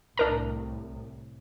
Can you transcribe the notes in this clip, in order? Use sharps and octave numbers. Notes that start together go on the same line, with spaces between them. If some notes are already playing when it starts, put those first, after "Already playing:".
C2 A2 D4 A#4 A#5